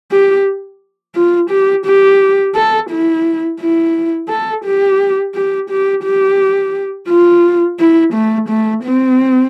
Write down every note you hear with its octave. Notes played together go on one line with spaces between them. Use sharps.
G4
F4
G4
G4
A4
E4
E4
A4
G4
G4
G4
G4
F4
E4
A3
A3
C4